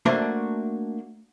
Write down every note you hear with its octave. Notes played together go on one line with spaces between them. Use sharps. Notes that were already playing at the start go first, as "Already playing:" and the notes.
A3 A#3 D4 F#4 C5 E5